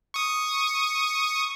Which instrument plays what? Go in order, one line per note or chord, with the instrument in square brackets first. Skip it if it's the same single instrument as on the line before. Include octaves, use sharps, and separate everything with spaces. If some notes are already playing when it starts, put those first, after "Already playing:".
[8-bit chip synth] C#6 D#6